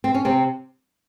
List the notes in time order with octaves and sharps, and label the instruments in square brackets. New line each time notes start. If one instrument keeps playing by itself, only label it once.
[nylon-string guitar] C4
C#4
C3 C4